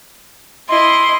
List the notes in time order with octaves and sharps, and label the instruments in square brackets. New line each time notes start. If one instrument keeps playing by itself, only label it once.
[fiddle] E4 D#5 [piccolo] C6